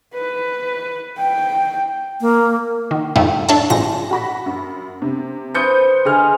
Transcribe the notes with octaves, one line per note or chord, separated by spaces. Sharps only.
B4
G5
A#3
D#3
F2 G#2 G3 A3
D4 A4 C#5 E5 A5
A1 G#2 F3 A#6
F#4 B5 A#6
F#2
C3
B4 C5 D#6 G6 C#7
D3 G#4 D#5 G#5 F6